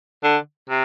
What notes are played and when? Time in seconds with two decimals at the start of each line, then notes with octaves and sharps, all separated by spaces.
0.23 D3
0.70 C3